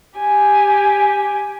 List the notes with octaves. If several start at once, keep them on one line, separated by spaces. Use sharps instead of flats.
G4 G#5